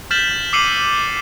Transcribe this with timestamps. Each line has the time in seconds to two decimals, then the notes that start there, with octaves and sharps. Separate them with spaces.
0.11 F6 G6 A6 B6 E7 F#7
0.53 D6 E6 C7 C#7 D#7 F#7